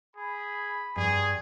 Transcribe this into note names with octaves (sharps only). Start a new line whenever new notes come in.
G#4 B5
G2 G#4